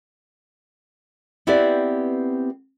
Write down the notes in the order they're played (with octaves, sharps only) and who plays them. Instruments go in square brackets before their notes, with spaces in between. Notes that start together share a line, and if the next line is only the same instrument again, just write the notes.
[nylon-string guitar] B3 C4 E4 G4 B4 D5